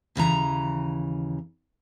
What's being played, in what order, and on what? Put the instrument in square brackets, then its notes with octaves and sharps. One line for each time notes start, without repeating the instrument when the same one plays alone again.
[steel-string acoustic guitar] D#2 C#3 E3 A#5